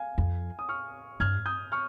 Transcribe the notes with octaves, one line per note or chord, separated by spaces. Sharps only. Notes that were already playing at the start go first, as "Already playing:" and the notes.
Already playing: F5 G#5
F2
D#6
C#6 F6
G2 F6 G#6
D#6 G6
C#6 F6